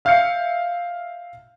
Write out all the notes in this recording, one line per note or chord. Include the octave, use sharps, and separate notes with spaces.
E5 F5 F6 G6 C7 C#7